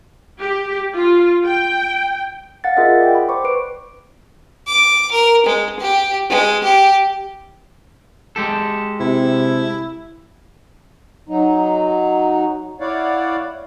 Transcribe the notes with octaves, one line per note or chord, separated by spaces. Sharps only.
G4
F4
G5
F5 F#5 A6
F4 G#4 A#4 D#5 E5 F#5
D5 G5
B5
C5 C#6 D6
B4 D7
D6
A#4
G#3
G4
G#3
G4
G#3 G4 A4
C3 E4
F#3 D#4
E4 C#5 D5 F5 F#5